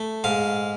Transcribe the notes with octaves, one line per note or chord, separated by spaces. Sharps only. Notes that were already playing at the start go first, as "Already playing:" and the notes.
Already playing: A3
G#2 F5